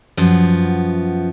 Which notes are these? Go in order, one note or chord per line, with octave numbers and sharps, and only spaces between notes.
F#2 F3 B3